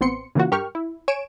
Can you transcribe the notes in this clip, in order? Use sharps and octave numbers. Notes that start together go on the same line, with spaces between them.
A1 B3 C4 C6 C#7
C#3 E3 A#3 F4 F#4
G2 G4 A#4 C#6 F6
E4
C#5 G#5 D7 E7